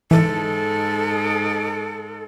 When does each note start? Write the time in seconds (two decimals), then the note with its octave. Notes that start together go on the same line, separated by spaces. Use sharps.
0.11 G#2 E3 A4